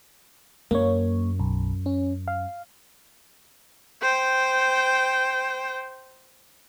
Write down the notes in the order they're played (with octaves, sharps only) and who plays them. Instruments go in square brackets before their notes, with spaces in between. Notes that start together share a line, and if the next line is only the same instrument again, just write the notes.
[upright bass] F#2 [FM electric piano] A#3 C#5
[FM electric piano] B1
C#4
F5
[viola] C5 G5